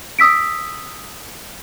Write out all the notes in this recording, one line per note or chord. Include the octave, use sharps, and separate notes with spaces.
D#6 E6 B6 D7